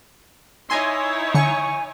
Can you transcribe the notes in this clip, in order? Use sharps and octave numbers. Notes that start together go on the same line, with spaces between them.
D#4 E4 C#5 D#5 G#5 C6
D3 G#5 C#6